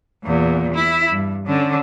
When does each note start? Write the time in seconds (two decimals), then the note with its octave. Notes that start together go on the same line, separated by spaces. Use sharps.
0.24 E2 A#2
0.74 E4
1.11 G2
1.46 D3 C#4